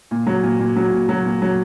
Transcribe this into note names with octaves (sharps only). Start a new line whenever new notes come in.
A#2
F#3
A#2
A#2
F#3
A#2
F#3
A#2
F#3